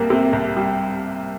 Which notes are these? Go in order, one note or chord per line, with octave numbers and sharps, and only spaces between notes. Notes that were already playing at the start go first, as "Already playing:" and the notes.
Already playing: C2 G3 A#3
C3
C2
G3